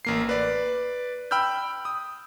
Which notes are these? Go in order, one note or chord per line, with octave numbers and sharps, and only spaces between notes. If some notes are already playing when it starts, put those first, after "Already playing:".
A1 A#3 C7
B4 D5
G5 B5 E6 F6 G6
D#6